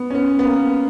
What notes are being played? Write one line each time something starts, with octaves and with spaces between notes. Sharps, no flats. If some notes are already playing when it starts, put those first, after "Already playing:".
Already playing: B3
C#4
B3
B3
A#3